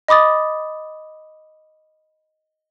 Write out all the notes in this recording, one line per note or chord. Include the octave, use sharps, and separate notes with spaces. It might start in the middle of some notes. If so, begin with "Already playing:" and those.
D#5 B5 D6 D#6 A6